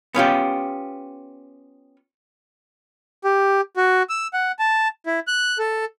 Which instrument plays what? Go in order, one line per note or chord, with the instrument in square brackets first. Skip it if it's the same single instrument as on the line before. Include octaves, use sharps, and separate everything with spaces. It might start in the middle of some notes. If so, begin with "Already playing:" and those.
[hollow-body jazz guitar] B3 C#4 F4 G4
[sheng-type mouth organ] G4
F#4
E6
F#5
A5
E4
F#6
A4